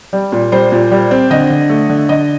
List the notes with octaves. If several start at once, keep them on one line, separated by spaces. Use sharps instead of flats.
G3
A#2
G3 C5
A#2
G3
C4
D3 D#5
D3
A3
D3
D3 D#5